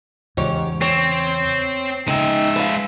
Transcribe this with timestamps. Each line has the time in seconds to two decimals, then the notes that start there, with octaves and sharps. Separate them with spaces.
0.37 E2 G#2 C#3 E3 G4 C#5
0.81 C4 C#5
2.08 C#3 G#3 D#4 E5 G5
2.56 B4 F5